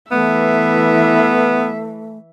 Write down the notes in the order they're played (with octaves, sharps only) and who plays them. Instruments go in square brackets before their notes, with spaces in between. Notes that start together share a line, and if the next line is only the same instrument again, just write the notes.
[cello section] E3 [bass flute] A3 [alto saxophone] B3 [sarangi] E5